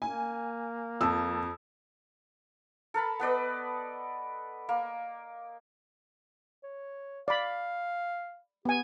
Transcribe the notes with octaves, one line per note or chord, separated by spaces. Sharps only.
A#3 G#5
F2 A5 E6
A4 A#4 A5 B5
B3 B4 D5 D#5
A#3
C#5
D5 F5 B5
B3 G4 G#5